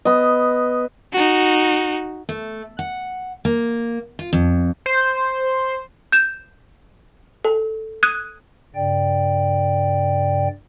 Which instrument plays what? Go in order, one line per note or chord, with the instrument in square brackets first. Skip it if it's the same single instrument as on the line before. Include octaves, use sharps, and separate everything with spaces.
[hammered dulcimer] B3 D#5
[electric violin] D#4 F#4
[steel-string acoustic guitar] A3
F#5
A#3
F4
F2
[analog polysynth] C5
[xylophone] G6 E7
A4
D#6 F#6 G#6 D#7
[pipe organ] G2 C#3 D5 G5